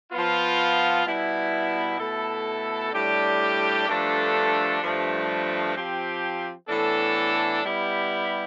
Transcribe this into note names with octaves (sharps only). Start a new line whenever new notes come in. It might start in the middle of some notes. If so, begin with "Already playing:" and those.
F3 B3 F4
B2 G3 B3 E4
B2 A3 E4 A4
A2 G3 D4 G4
G2 F3 A3 D4 A4
G2 F3 A3
F3 C4 G4
A2 E3 B3 D4 A4
G3 B3 E4 G4